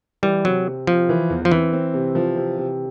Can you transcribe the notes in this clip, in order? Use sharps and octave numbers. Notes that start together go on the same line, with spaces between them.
E3 G3
C3 F#3
C3
C3 F3
E3
E2
F3
E3 C4
C4
C3
F3
C3
C3